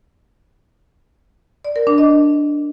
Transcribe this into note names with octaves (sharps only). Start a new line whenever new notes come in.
D5
A#4
D4
D#5